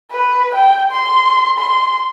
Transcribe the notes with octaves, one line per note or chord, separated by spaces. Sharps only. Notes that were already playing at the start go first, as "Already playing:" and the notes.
B4
G5
C6
C6